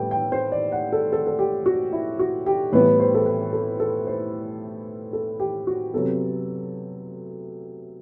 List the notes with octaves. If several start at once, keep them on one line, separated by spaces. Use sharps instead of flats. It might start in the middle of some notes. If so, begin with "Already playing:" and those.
Already playing: A2 G3 B3 A4 G5
G5
C5
D5
F#5
A4
A4
A4
G4
F#4
E4
F#4
G4
A2 E3 G3 B3 B4
C5
A4
B4
A4
A4
C5
A4
G4
F#4
C3 F#3 B3 A4